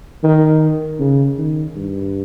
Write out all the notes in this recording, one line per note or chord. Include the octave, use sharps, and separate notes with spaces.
D#3
C#3
D#3
G2